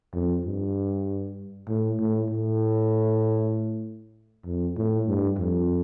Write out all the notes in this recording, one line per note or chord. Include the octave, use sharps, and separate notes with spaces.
F2
G2
A2
A2
A2
F2
A2
G2
F2